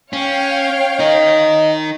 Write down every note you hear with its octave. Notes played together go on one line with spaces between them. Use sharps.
C#4 C#5 F5 G5
D#4 A#4 D#5